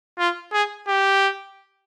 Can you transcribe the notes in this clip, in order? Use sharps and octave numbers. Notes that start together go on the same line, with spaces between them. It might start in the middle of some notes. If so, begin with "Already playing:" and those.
F4
G#4
G4